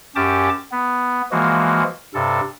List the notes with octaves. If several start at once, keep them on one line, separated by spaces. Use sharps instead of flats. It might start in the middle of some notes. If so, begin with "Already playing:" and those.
F#2 C#4 G4 A5 D6
B3
E3 F3 G#3 A#3 F#4
G2 C3 A4